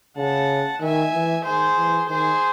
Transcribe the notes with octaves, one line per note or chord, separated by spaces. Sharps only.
C#3 F#5 A5
D#3 E5 G#5
E3
D#3 G#4 C5
E3
D#3 G#4 C5